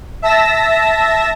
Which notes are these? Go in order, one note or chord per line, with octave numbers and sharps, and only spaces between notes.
E5 A5 E6 A#6